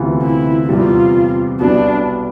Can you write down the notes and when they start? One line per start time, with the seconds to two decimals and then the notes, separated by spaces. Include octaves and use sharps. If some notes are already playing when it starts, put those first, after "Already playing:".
Already playing: D2 C3 E3 B3 F4
0.22 E4
0.68 E2 C3 G3 F4
1.60 B1 B2 G3 B3 D4 E4